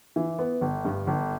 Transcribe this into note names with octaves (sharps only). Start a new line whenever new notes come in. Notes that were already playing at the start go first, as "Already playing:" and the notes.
E3
B3
G1
G2
G1